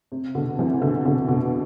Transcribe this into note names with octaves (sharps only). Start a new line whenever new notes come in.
C3
B2 D3
C3 E3
B2 D3
B2 D3
B2 D3